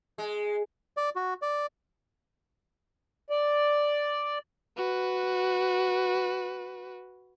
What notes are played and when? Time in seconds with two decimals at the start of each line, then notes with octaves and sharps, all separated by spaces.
0.18 G#3
0.97 D5
1.16 F#4
1.42 D5
3.30 D5
4.77 F#4 B4